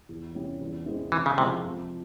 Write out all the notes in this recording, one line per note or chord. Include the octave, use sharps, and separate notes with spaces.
E2
C3 G3 C#4 E4
E2
E3 G#3 C4
C3 E3
C#3
C3 F3 G#3 C4 E4
F2